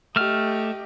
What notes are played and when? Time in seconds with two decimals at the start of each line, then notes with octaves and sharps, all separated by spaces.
0.16 A3 G4 D#5 F6